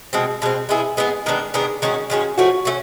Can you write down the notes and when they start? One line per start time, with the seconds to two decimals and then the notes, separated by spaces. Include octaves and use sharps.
0.13 B2 G#3 C4
0.42 B2 G#3 C4
0.69 G#3 B3 E4 G#4
0.97 G#3 B3 E4 G#4
1.26 D#3 G#3 B3 D4
1.54 D#3 G#3 B3 D4
1.82 D#3 G#3 C#4 F#4
2.10 D#3 G#3 C#4 F#4
2.38 F3 A3 C#4 F#4
2.65 A3 C#4 F#4